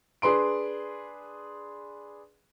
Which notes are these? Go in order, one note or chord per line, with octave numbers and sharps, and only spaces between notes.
D4 G#4 B4 C6 D7